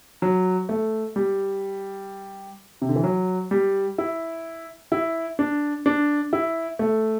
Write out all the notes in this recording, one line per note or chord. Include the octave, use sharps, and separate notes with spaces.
F#3
A3
G3
C3
D3
E3
F#3
G3
E4
E4
D4
D4
E4
A3